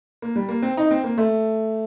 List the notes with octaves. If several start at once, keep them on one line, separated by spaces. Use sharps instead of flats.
A#3
G3
A#3
C4
D#4
C4
A#3
A3